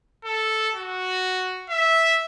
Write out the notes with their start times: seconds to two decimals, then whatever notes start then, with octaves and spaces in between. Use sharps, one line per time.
0.25 A4
0.75 F#4
1.70 E5